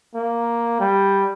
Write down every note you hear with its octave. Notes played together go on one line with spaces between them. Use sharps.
A#3
G3